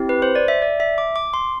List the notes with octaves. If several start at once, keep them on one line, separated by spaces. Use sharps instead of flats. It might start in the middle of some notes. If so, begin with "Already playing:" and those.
Already playing: C4 E4 G4
B4
C5
D5
E5
D5
E5
D6
D6
C6